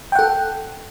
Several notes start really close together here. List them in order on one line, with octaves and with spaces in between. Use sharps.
G5 F#5 A4